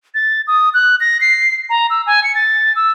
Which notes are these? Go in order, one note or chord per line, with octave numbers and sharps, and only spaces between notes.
A6
D#6
F#6
A#6
C7
A#5
E6
G#5
C#7
A6
E6